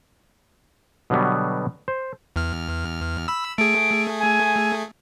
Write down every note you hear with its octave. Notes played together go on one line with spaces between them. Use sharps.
B2 D3 F#3 G3 B3
C5
E2 F6
B5 E6
A3 G#4 D7
G#5